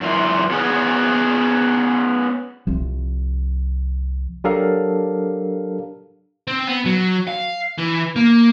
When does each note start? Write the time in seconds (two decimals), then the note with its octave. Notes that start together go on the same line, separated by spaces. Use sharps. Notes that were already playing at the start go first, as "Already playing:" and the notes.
0.01 F#2 E3 F4
0.51 B3 C#4 G#4
2.67 C2 F3
4.44 F#3 D4 G4 A4 A#4 F5
6.48 C4
6.67 B3
6.86 F#3
7.27 F5
7.78 E3
8.16 A#3